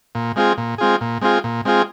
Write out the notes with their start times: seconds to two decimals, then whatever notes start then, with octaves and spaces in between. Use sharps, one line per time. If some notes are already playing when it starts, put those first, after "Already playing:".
0.15 A#2
0.36 G#3 C4 F4 G#4
0.58 A#2
0.78 G#3 C4 F4 G#4
1.01 A#2
1.21 G#3 C4 F4 G#4
1.44 A#2
1.65 G#3 C4 F4 G#4